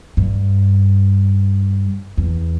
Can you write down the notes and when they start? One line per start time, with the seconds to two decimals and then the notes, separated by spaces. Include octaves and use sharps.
0.17 G2
2.17 E2